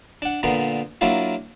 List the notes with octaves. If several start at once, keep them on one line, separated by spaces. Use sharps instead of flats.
D4 F#5
A#2 D3 A#3 B3
F#3 A#3 D4 E4 F4